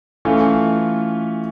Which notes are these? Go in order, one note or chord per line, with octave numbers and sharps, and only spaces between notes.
E3 A3 C#4 F4